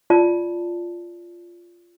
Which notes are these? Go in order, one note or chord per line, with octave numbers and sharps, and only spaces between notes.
F4 D5 A5